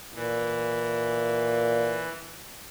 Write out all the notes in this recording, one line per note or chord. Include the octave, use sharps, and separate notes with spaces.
A#2 E3